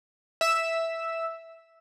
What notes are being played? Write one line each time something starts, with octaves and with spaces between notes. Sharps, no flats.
E5 E6